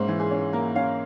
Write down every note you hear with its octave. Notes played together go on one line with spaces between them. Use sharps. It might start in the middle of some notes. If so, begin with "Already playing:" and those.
Already playing: G#2 A#3 C#4 C5 E5
E3
G#4
C#4
A#3 A#4
C#4 F5